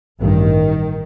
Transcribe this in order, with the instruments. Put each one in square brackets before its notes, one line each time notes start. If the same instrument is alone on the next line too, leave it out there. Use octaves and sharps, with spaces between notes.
[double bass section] A1 G2 D#3